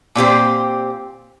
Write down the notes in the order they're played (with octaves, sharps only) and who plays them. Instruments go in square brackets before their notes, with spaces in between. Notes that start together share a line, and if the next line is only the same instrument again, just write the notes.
[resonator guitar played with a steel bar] A#2 C4 G4 C5